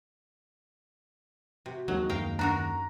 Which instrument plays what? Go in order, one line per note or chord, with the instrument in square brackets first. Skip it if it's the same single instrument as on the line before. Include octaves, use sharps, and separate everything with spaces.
[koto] C3 [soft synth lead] F#4
[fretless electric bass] D#2 D#3 G#3 [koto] F#3
[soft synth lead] F#2 [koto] A#4 F5 G5
[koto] D4 F#4 A#4 [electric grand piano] A#5